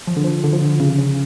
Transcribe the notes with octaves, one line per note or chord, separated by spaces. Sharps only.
F3
D3
F3
D3
F3
D3
C#3
C#3